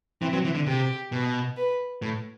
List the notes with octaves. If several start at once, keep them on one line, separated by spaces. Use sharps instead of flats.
E3 C4
F#3
E3
D3
C3 G4
B2
B4
A2